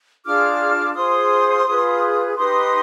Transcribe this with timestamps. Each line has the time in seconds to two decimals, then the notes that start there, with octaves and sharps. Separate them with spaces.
0.25 D4 F4 G#4 D6 F6
0.95 F4 G#4 C5 C6 D#6
1.66 F4 G#4 B4
2.36 D#4 G4 B4 C6 D#6